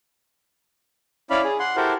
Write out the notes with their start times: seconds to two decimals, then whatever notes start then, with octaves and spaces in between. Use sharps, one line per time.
1.30 C#4 E4 D5 F5 B5
1.44 G#4
1.59 F#5 C6
1.76 E4 F#4 G4 A4 A#4 C5